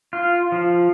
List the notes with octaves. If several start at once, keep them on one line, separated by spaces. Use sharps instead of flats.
F4
F3